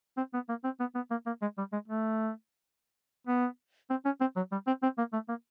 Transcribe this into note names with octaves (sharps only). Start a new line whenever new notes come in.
C4
B3
A#3
C4
B3
B3
A#3
A#3
G#3
G3
G#3
A3
B3
C4
C#4
C4
F#3
G3
C4
C4
A#3
A3
A#3